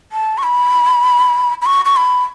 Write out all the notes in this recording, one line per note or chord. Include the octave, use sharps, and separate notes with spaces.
A5
C#6
B5
B5
C#6
C#6
B5